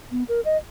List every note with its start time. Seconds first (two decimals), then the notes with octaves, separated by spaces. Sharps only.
0.11 B3
0.29 A#4
0.45 D#5